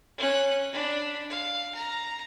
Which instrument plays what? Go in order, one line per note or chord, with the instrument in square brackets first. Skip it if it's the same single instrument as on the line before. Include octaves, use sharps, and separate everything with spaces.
[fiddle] C#4 F#6
D4 B5
F5
A#5